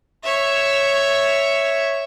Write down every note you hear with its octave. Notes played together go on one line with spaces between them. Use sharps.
C#5 E5